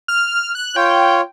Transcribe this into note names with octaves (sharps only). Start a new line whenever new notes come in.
F6
F#6
F4 C#5 G5